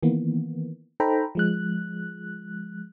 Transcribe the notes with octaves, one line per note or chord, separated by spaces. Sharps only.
D#3 E3 A#3 B3
D#4 A4 C5 G5 A#5 B5
F3 G#3 F#6